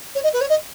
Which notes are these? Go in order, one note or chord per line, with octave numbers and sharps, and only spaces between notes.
C#5
D#5
B4
C#5
D#5